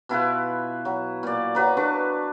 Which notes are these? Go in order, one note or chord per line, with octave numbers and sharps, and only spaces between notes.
B2 E4 F4 B4
F#3
A#2 D5
F#3 B4 A#5
D4 B4 C#6